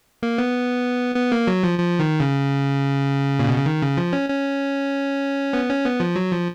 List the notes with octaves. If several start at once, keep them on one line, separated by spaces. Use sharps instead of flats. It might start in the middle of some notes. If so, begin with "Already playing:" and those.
A#3
B3
B3
A#3
F#3
F3
F3
D#3
C#3
A#2
B2
C#3
D#3
C#3
F3
C#4
C#4
B3
C#4
B3
F3
F#3
F3